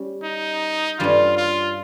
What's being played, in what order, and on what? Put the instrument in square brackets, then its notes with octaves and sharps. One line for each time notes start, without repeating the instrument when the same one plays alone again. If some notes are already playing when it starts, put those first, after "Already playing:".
Already playing: [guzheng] G3 C#4 G4
[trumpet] D#4
[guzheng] G2 G3 C#4 [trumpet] F4
[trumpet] F4